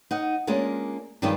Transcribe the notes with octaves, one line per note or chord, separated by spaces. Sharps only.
D#4 F#5
G#3 A#3 C#4 D4 F4
G2 D#3 F3 G#3 D4 D#4